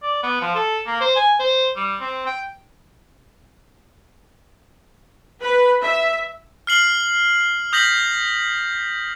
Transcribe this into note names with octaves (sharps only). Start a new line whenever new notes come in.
D5
B3
F3
A4
A#3
C5
G#5
C5
G3
C4
G5
B4
E5
F6 C7 F#7
D#6 G6 A#6 B6 F#7